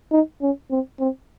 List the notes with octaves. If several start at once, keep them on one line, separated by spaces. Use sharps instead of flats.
D#4
C#4
C4
C4